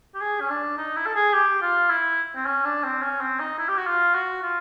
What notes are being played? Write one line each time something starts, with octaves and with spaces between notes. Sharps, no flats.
G4
G#4
C#4
D4
D#4
E4
A4
G#4
G4
F4
E4
C4
C#4
D4
C4
C#4
C4
D#4
E4
G4
F#4
F4
F#4
F4